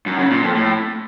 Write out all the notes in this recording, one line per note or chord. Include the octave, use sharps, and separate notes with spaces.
F#2
C#3
A#2
F2
A2